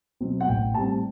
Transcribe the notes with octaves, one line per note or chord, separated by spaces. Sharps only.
B2 F#3 C4
F#5
A1 G5
A2 G3 C4 A5